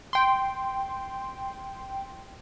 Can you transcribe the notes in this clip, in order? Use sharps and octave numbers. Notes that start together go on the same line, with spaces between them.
G5 C6